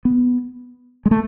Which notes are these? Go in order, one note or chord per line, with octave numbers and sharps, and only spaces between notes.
B3
G#3
A3